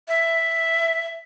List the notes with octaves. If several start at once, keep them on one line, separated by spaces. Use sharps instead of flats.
E5